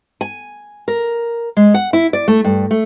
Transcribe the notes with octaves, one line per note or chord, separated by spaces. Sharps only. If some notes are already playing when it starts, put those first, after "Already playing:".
G#5
A#4
G#3
F#5
E4
D5
A3
G2
A3